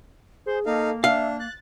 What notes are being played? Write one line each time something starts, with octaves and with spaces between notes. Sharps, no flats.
G#4 C5
A#3 D#4 A4 F5
D4 E5 F5
F#6 A6